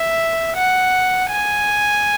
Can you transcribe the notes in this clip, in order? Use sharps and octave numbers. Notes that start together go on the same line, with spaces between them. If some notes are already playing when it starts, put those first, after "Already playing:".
Already playing: E5
F#5
G#5